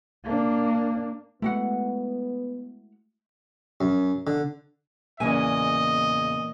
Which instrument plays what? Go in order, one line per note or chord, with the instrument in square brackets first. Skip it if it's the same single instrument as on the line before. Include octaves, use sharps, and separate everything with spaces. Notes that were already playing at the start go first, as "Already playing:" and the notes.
[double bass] A#3 D4
[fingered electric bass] G#3 A3 [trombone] B3 [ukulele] E4 F#4 F#5
[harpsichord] F#2
D3
[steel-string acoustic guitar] E2 C#3 G#5 [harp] A#2 E3 [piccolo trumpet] D#5